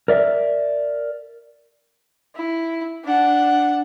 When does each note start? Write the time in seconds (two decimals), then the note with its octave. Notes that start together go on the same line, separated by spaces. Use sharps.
0.08 A#4 D5 E5
2.35 E4
3.05 D4 F#5